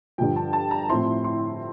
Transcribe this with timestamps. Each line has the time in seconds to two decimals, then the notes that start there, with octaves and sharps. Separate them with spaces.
0.18 G2 D3 F3 G5
0.36 A5
0.53 A5
0.71 A#5
0.90 A2 F3 C4 E4 C6
1.24 C6